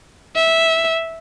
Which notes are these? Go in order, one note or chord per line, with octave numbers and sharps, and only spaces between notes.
E5